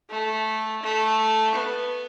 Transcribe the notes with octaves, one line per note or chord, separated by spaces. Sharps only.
A3
A3
B3